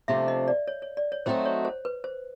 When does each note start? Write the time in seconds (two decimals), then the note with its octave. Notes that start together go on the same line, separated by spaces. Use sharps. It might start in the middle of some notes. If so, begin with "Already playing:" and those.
0.08 C3 F3 A3 D4 E5
0.28 D#5
0.48 D5
0.68 C#5
0.82 C#5
0.97 D5
1.12 C#5
1.26 F#3 A3 C4 D#4 F#4 C5
1.45 C#5
1.65 C5
1.85 B4
2.04 C5